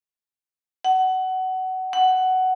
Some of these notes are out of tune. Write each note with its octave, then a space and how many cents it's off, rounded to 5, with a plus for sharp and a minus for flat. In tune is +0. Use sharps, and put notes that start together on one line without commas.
F#5 +20
F#5 +10